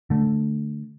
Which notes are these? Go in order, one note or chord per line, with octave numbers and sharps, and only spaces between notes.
D3 A3